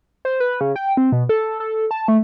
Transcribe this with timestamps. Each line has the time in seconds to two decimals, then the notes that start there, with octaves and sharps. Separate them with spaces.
0.25 C5
0.40 B4
0.61 C#3
0.76 G5
0.97 C4
1.12 B2
1.29 A4
1.60 A4
1.91 A5
2.08 A3